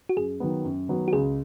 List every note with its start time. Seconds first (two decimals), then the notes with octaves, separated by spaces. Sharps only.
0.09 F#4
0.17 F#2 G#4
0.40 D#3 F#3 B3
0.64 F#2
0.88 D#3 F#3 B3
1.08 F#4
1.12 C#2 G#4